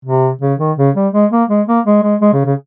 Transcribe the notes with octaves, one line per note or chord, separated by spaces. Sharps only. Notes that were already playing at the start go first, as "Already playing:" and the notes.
C3
C#3
D#3
C#3
G3
G#3
A#3
G#3
A#3
G#3
G#3
G#3
C#3
C#3